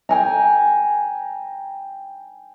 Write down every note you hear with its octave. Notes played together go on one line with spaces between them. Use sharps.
G5 G#5 A#5